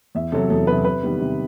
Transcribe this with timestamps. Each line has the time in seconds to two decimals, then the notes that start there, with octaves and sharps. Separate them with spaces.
0.15 E2 E5
0.32 C3 F#3 A4
0.50 E2 A4
0.67 C3 F#3 B4
0.84 C3 B4
1.03 D#3 G3 B3
1.20 C3